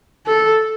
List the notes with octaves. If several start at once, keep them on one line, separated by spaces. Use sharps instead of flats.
A4